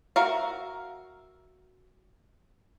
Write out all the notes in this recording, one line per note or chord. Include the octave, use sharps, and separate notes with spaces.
F#4 A#4 E5 F5